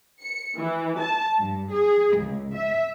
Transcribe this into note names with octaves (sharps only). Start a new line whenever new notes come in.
C#7
E3
A5
G2
G#4
C#2
E5